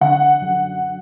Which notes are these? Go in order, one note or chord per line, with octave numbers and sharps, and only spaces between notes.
D3 F#5
F#2